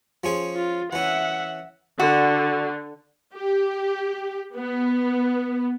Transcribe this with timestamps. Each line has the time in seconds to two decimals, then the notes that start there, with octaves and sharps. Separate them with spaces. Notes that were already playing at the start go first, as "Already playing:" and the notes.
0.24 F3 C#4 G#4
0.56 F4
0.93 E3 C#4 E5 F#5
1.99 D3 F#4
3.35 G4
4.56 B3